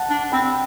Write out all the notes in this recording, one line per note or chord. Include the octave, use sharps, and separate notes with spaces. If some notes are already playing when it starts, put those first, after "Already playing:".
Already playing: F#5 A5
D4
C4 G5 B5